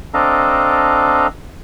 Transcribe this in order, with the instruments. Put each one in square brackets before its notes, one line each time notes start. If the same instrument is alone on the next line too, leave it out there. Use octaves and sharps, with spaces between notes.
[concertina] C4 D4 A4 D#5 F5 A#5